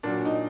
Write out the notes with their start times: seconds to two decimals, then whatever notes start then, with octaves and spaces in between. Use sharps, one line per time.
0.03 A#2 F#3 D4
0.25 D#4